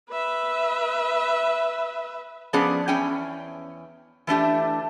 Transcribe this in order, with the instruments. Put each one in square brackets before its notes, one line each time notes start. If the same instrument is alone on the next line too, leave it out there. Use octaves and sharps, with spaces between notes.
[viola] B4 E5
[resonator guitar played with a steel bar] F3 B3 C#4 G#4 D5
E2 C#4 G5 G#5
E3 A3 D4 G4